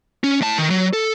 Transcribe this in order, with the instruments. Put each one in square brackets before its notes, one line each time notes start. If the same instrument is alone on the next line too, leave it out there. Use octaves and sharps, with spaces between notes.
[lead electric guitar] C#4
A2 A5
D#3
F#3
A4